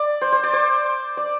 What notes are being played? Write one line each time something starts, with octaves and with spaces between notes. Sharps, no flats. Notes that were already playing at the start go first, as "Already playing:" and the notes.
Already playing: D5
C5
C5
D5
C5
D5